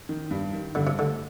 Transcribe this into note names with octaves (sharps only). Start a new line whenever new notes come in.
D#3
G2
D#3
G2 D3
C3
D3 A3